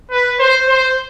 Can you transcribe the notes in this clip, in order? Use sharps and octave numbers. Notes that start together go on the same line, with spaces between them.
B4
C5
C5